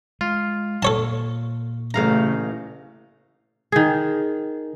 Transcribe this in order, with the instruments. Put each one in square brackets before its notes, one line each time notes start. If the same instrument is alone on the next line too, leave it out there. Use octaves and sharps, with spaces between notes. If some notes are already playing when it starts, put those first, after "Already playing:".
[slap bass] G#3 [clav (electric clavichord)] F4
[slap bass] A#2 [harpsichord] A4 C#5 A5
[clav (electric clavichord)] A1 F5 A#5 [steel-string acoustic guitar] C#3 A3
[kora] D#3 G#4